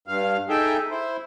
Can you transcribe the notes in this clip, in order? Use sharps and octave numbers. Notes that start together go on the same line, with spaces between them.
G2 F5
D#4 G#4 A4 E5 G5
E4 C5